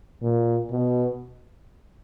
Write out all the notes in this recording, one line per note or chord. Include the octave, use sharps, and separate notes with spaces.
A#2
B2